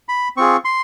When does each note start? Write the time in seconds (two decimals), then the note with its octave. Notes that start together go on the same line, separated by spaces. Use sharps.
0.08 B5
0.37 C4 F4 G#4 C#6
0.65 C6